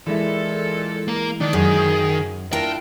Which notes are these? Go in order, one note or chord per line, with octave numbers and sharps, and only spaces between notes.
A#2 E3 G#3 E4 A4
A#3 A#4
D#3 D4 D5
F#2 G#4
D4 E4 F4 A#4 G5